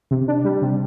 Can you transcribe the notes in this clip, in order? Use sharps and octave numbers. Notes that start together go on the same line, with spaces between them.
C3
D4
G3
C3